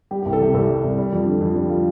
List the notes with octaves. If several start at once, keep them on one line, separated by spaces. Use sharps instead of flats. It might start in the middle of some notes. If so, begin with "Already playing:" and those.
G3 G4
G4
C2
A4
C3 G4
C2 A4
G3
C2
G3
F2
D3
F2
G3
F4